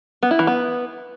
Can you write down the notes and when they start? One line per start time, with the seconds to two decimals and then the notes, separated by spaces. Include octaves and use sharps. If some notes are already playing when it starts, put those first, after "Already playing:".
0.23 B3
0.31 E4
0.39 E3
0.47 B3